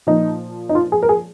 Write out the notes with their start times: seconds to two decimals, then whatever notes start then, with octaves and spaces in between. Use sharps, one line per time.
0.07 A#2 F3 D#4
0.69 D#4
0.75 F4
0.92 G#4
1.03 A#4
1.09 G#4